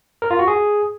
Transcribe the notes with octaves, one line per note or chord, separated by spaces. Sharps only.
A#4
F4
F#4
G#4